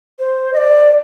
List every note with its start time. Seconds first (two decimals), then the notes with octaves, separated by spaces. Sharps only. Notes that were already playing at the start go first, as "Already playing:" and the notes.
0.19 C5
0.53 D#5
0.57 D5